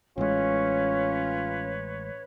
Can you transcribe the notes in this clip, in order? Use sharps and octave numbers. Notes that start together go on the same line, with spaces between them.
A1 G#3 C#4 F4 B4 C#5